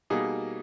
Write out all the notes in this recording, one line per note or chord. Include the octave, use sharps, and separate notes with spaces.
B2 G3 A#3 D#4 G#4